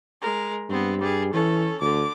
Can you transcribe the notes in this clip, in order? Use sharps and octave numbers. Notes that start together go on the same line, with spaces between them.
G#3 A#4
G2 B3 C4
G3 G#4
E3 C#4 A4
D2 D3 D6